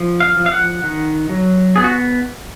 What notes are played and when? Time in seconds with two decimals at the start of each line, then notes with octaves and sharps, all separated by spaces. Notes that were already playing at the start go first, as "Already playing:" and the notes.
Already playing: F3
0.20 F5
0.37 F3
0.46 F5
0.52 F#5
0.84 D#3
1.30 F#3
1.76 B3 G#4
1.84 F#4